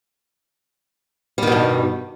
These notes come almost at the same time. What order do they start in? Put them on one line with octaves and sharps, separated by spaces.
G3 D#3 B2 G2